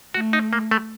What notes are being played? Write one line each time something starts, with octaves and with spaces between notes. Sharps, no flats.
A3 F#4
D#4
A#3
A3